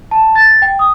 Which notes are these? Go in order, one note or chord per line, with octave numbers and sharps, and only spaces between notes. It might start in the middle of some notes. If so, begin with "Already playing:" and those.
A5
A6
G5
D#6